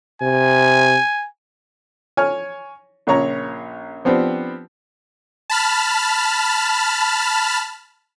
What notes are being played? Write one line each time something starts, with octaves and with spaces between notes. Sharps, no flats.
C3 G#5
C#5 G#5 F6
A#1 C#3 C#5 A#5
F3 B3 C4 D4 G4
A5 B5 F6